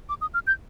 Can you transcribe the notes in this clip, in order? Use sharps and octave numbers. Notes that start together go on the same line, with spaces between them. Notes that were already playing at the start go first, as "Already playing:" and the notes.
D6
D#6
F6
G6